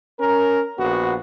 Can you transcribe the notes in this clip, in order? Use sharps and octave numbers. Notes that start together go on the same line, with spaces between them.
C#4 A#4
A#1 B3 F#4